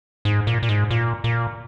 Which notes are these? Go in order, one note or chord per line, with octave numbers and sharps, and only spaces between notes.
G#2
A#2
A#2
G#2
A#2
A#2